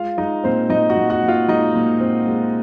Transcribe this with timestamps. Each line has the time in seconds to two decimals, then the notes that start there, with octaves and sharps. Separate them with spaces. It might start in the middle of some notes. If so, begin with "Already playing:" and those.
Already playing: G#3 F4 F5
0.17 G#3 D#4 D#5
0.44 A#2 C4 C5
0.70 A#2 D#4 D#5
0.90 F#4 F#5
0.97 A#2
1.10 F#4 F#5
1.23 A#2
1.28 F4 F5
1.48 G#3 D#4 D#5
1.75 A#2
2.00 C4
2.27 G#3